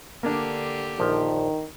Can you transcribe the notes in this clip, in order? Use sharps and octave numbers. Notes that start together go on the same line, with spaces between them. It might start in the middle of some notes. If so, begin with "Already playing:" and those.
D3 A#3 D4 G4
A#1 D#3 F3